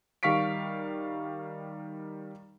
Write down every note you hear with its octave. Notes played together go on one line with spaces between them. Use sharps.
D#3 G3 F5 C#6 B6 D7